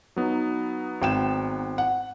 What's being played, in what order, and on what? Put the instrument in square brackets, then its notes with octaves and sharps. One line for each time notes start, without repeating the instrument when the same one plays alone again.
[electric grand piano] F#3 B3 D#4
[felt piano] G#1 G5 E7
F#5